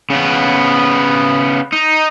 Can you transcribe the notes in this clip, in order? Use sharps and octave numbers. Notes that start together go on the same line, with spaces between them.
C#3 B3
D#4